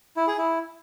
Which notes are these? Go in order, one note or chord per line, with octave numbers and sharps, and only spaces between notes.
E4
G#4
E4